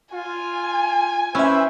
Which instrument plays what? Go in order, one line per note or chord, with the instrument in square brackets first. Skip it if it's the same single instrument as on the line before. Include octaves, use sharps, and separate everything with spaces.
[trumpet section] F4 [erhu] G#5
[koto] C#4 [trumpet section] E4 B4 C5 [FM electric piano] E5 E6